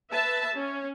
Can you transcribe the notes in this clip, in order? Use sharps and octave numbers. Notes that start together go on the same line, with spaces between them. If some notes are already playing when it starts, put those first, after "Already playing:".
B4 E5 A5
C#4